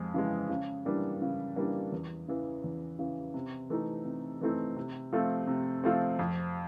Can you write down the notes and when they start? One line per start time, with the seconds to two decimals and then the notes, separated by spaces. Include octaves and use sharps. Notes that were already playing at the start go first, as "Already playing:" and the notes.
Already playing: F2 G#3
0.14 C#3 E3 G#3
0.49 C#3
0.85 E3 G3 A#3 D4
1.22 C#3
1.56 E3 G3 A#3 D4
1.92 E2
2.28 C#3 E3
2.64 E2
2.99 C#3 E3
3.34 C3
3.70 E3 A3 C4 D#4
4.05 C3
4.41 E3 A3 C4 D#4
4.77 C3
5.13 F3 A3 C4
5.47 C3
5.84 F3 A3 C4
6.19 F2